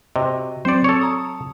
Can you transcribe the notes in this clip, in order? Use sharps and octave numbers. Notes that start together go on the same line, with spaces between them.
C3 F#4 D#5
F#3 C4 C5 D5 C#7
A4 C#5
A5 A#5 D#6